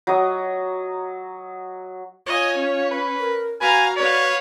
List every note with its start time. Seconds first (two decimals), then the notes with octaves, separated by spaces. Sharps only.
0.07 F#3 D#5
2.27 F4 C#5 D#5 G#5
2.57 C#4
2.91 B4
3.19 A#4
3.61 F#4 B4 F5 G#5 A#5
3.97 B4 C#5 D5 F5